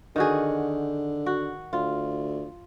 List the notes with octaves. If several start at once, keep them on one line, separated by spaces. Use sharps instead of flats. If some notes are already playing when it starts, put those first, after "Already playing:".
D3 D#3 F#4 G#4
F#4
D2 F4